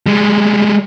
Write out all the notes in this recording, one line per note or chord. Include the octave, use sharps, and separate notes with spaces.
G3 G#3